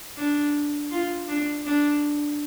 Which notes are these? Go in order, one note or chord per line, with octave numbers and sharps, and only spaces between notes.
D4
F4
D4
D4